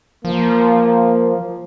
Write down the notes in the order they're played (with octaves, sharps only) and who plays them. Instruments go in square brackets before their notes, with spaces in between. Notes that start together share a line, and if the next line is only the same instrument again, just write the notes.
[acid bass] F3 [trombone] A#3